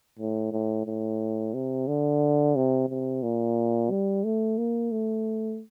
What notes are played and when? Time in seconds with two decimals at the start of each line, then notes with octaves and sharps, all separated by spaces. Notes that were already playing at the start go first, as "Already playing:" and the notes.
0.19 A2
0.52 A2
0.87 A2
1.54 C3
1.88 D3
2.56 C3
2.89 C3
3.23 A#2
3.91 G3
4.24 A3
4.58 A#3
4.92 A3